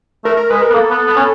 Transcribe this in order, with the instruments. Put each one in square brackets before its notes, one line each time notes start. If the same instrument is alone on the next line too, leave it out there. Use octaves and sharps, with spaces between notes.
[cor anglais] A3 [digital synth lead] A#4
[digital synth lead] A#4
[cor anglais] G#3 [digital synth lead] B4
[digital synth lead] A#4
[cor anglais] B3
[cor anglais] A#3 [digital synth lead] A4
[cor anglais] B3
B3
C#4